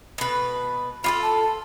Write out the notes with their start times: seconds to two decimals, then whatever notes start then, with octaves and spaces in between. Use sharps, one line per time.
0.18 B2 B4
1.04 F4 G4 A4 B5
1.22 A5